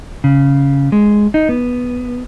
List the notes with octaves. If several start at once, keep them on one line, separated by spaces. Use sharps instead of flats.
C#3
G#3
D#4
B3